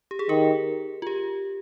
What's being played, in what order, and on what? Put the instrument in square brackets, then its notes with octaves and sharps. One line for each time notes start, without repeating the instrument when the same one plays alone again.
[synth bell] G4
G#4
[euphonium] D#3 [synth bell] G4 A#4
[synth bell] F4
G4